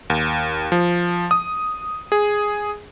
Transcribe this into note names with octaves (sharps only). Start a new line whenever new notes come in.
D#2
F3
D#6
G#4